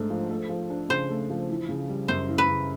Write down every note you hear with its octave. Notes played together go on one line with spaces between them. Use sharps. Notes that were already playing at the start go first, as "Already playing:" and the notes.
Already playing: G#2 A3 D4
F3
A3
F3
D4
C#3 C5
A3
F3
E3
C#3
G3
F#2 C5
E3
B4
C#3